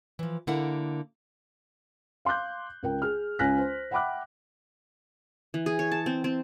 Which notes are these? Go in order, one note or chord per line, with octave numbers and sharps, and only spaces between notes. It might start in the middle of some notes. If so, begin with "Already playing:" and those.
E3 F3
D3 A#3 E4 A#4 F#5
F5 C6 D6 F#6 G6
C#2 A#4 G5
G#4 F6
C#2 C#4 G#5 F#6 A#6 B6
C5
E5 F#5 G5 B5 D6 F#6
E3
G#4
C#5
A5
C4
C4